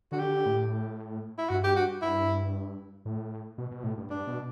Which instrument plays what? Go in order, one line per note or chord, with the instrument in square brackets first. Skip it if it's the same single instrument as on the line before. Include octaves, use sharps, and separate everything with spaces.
[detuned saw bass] D3 [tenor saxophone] F#4
[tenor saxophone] G4
[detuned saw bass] D3
A2
[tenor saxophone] E4
[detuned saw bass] G2 [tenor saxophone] F#4
[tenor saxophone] G4
F#4
[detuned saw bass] G2 [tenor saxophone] E4
[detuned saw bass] A2
B2
B2
A2
G2
[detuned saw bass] G2 [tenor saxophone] D4
[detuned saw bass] B2